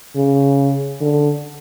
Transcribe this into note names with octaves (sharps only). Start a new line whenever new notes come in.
C#3
D3